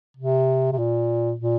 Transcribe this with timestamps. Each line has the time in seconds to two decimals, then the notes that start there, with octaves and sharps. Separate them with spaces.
0.17 C3
0.72 C3
0.78 A#2
1.39 A#2